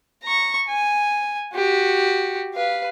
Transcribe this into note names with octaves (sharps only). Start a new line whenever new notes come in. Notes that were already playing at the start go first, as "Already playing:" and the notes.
A#5 C#6
G#5
F#4 G4
B4 F5